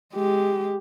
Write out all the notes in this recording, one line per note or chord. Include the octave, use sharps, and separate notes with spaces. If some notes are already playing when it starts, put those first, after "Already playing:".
G#3 G4